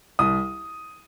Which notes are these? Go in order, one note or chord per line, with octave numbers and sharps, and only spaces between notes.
C2 D#6